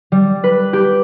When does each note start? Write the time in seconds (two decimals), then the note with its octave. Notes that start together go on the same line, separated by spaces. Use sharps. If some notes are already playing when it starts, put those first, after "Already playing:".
0.12 G3
0.44 B4
0.73 G4